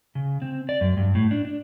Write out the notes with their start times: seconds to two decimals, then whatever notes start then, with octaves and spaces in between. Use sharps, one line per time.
0.15 C#3
0.42 C4
0.69 D5
0.81 F#2
0.97 G2
1.15 A2
1.31 D4
1.45 D4